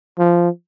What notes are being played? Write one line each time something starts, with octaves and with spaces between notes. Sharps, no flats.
F3